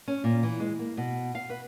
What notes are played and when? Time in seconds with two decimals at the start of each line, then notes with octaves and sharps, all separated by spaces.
0.08 C#4
0.24 A#2
0.43 E3
0.60 G#3
0.79 A#3
0.97 B2
1.35 F5
1.50 B4